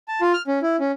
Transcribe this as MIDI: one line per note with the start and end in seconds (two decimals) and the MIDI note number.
0.08 0.21 81
0.21 0.32 65
0.33 0.42 89
0.47 0.59 61
0.62 0.76 64
0.80 0.92 61